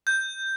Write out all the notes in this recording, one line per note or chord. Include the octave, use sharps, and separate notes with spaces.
G6